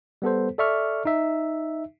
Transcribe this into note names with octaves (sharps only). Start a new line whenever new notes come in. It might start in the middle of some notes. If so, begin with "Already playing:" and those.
G3 B3 A4 C5
A4 D5 E5 C#6 F6
D#4 E5